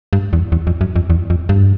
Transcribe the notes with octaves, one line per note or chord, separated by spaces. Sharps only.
G2
E2
E2
F2
F#2
F2
E2
F2
G2